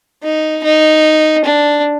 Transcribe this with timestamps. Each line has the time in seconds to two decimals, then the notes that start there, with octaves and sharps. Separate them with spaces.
0.23 D#4
0.63 D#4
1.44 D4